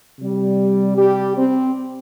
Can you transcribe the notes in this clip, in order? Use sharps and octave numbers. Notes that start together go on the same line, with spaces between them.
C3 G3
G3 G4
C4